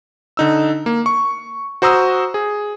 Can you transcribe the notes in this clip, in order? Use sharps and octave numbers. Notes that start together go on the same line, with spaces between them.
D3 D#4 E6
A#3
C#6
F#4 C5 A#5 D#6 E6
G#4